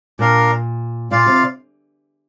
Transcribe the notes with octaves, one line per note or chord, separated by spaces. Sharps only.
A#2 D4 A#4 F5
A#2 F4 D5 F5
C3